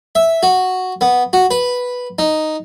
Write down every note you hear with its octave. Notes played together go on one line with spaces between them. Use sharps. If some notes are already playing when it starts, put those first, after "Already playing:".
E5
F#4
B3
F#4
B4
D#4